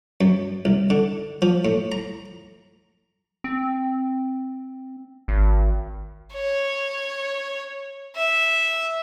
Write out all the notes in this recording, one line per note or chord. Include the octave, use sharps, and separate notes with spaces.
F#2
C2
D3
F3
A2
A#5
C4
G#1
C#5
E5